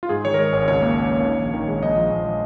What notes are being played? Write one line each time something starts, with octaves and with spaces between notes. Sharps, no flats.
F4
G#2 G#4
D#3 C#5
A#4
G#3 C#5
G#1 C#5
C#2 C#5
A#3
C#4
A#3
D#3
A#1
D#3
G#3
A#1 D#5
F3
A#1
F3